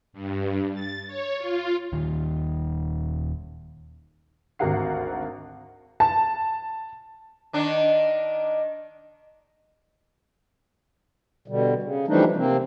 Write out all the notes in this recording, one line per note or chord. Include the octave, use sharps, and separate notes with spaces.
G2
A6
C#5
F4
D#1 D#3
G#1 D2 F#4 A#4 F#5 C7
A5
D#3 D4
B2 D3 G3
C#3
E3 F3 G3 A3 D4 D#4
C3 A#3 C4